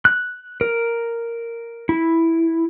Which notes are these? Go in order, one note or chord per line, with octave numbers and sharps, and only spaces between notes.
F#6
A#4
E4